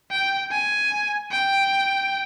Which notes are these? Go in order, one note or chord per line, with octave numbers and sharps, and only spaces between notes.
G5
G#5
G5